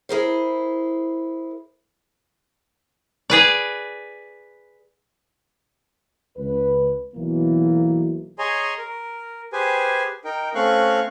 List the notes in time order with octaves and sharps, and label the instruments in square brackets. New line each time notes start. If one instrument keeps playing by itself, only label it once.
[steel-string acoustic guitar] E4 G#4 A#4 C5
[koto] G#4 B4 D5
[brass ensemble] C#2 B4
B1 E3 A#3
[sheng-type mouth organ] G#4 C#5 D#5 G#5 A#5 C6
A#4
G4 G#4 B4 C5 G#5
D#4 A#4 G5
A3 C4 C#4 F5 C#6 F#6